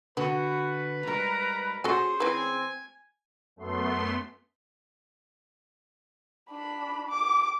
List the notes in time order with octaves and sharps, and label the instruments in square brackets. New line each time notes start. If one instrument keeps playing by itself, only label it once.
[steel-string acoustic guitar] D3 [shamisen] B3 [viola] F#4 [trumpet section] B4
[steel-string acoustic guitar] G#2 G3 [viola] A#4 A#5
[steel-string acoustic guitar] C#4 G#4 [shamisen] F#4 A4 G#5 [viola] C5
[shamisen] E3 B4 [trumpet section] C4 [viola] G#5
[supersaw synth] F#2 A3 B3 C6
[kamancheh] D4 B5
D6